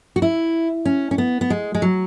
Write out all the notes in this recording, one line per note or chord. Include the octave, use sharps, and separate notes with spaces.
F#4
E4
C#4
C#4
B3
B3
G#3
G#3
F#3